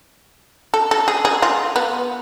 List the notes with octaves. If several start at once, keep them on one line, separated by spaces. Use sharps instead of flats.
A4
A4
G#4
G#4
F4
B3